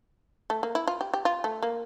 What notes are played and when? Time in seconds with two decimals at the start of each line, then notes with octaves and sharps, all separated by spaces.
0.50 A3
0.63 A#3
0.75 E4
0.87 F4
1.01 G4
1.14 G4
1.25 F4
1.44 A3
1.63 A#3